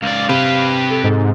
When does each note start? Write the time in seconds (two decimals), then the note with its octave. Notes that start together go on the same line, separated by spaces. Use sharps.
0.02 C#2 D5 F5
0.29 C3 G4 B4
0.90 A4
1.04 G#2 A4